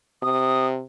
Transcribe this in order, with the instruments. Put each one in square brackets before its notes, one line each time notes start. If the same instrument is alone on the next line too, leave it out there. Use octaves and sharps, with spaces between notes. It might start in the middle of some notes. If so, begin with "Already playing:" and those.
[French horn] C3 [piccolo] D#6